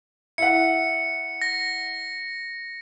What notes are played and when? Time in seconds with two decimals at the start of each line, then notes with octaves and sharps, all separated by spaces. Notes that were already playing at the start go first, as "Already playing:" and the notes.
0.38 E4 F#5 C#7
1.42 A#6